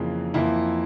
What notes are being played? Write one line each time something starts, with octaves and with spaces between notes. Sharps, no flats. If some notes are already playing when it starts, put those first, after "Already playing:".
Already playing: F2 C#3 E3 A#3
F2 E3 A#3 E4